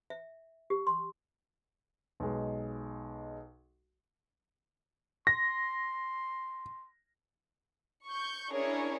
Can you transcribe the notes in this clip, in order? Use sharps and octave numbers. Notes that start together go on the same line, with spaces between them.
E5
G4
C6
B1 G#3
C6 A#6
C#6 G6
C#4 D4 E4 G#4 A#4 C#5